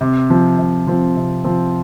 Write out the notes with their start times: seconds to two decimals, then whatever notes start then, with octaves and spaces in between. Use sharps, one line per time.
0.01 C3
0.30 F3 C4
0.59 C3
0.87 F3 C4
1.16 C3
1.44 F3 C4